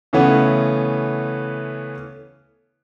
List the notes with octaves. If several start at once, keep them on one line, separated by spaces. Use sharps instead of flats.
C#3 E3 A3 B3 C#4